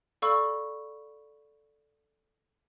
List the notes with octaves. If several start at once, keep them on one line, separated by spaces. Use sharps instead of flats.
A4 D5 F5 B5 C#6 E6